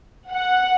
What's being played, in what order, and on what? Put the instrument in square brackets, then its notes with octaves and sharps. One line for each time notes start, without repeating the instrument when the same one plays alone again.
[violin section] F#5